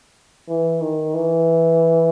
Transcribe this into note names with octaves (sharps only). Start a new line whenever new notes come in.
E3
D#3
E3